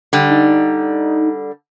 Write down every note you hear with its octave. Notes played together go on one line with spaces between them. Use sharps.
D3 G3
D#4